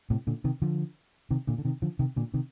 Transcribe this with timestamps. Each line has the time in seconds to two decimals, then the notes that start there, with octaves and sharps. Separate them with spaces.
0.10 A2 C3
0.27 A#2 D3
0.44 C3 D#3
0.62 D3 F3
1.31 C3 D#3
1.47 A#2 D3
1.58 D3
1.65 C3 D#3
1.82 D3 F3
1.99 C3 D#3
2.16 A#2 D3
2.34 C3 D#3